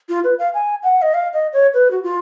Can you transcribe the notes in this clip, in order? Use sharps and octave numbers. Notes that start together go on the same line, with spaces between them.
F4
B4
F5
G#5
F#5
D#5
F5
D#5
C#5
B4
F#4
F4